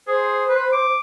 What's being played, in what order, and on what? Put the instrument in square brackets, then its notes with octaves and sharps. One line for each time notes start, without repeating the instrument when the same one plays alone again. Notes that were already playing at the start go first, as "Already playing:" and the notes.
[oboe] G#4 [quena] C5
[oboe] B4
D6